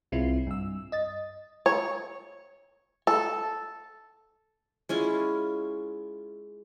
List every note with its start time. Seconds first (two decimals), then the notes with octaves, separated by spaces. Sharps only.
0.12 C2 C4 E4 F4 C7
0.47 G2 E6
0.92 D#5 A6
1.66 C#5
3.07 A4
4.89 G#3 C#4 E4 F4